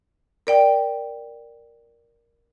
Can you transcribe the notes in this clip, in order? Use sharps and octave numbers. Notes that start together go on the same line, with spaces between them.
A#4 D5 G5